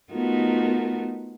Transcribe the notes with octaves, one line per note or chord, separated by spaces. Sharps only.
A3 B3 D#4 F4 F#4 A#4